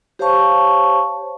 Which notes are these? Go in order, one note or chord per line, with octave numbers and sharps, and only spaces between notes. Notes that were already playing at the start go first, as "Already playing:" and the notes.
G4 C5 C#5 F5 A5 C#6